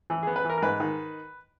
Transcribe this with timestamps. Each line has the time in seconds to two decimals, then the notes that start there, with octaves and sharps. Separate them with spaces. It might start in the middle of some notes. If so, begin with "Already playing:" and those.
0.10 E3
0.23 G#4
0.27 B3
0.36 B4
0.45 E3 A#4
0.58 A#4
0.62 G#2 B4
0.80 D#3